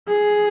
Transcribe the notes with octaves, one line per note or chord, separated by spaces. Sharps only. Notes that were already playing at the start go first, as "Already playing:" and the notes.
G#4